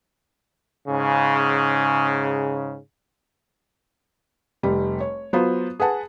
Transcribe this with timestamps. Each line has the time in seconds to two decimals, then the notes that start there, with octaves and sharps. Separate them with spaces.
0.88 G#2 C#3
4.63 F1 G3
5.00 C#5
5.33 F#3 B3 F4 C5
5.80 G#4 B4 F#5 A5